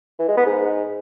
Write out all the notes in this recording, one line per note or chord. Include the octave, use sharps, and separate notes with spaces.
E3
G#3
B3
G#2